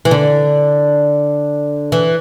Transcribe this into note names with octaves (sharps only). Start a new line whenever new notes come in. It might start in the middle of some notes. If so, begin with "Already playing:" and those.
E3
D3
E3